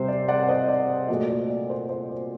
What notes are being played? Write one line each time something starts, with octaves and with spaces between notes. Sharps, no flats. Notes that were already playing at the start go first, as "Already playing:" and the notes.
Already playing: C3 G3 C4 C5
D5
D5 F#5
C5 D#5
D5
A#2 F#3 A3 D5
D5
D5
C5
C5
D5